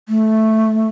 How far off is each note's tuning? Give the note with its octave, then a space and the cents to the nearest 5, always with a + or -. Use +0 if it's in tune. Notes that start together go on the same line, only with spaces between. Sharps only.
A3 -5